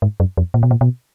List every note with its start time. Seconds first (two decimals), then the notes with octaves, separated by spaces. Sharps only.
0.02 G#2
0.20 F#2
0.37 F2
0.54 A#2
0.63 B2
0.71 A#2
0.81 B2